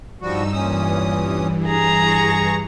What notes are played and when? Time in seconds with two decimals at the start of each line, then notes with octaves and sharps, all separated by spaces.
0.21 G2 F3 G3 D#4 F#4 E6
0.53 G2 A#2 E3 C#4 D#6
1.66 G#4 A#5
2.07 C#6